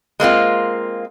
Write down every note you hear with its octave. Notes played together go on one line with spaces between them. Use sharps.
G#3 A#3 C4 F4